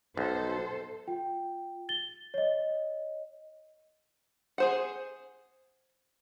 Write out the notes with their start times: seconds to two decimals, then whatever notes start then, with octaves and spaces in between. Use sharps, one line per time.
0.17 B1 A4 C5
1.08 F4 G5
1.89 A6 G7
2.34 C#5 D#5
4.58 G#4 C5 F#5